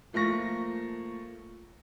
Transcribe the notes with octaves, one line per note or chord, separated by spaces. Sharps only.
F3 A3 A#3 C#6 A#6